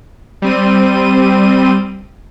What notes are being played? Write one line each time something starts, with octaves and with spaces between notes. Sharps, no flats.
G3 C4 D#7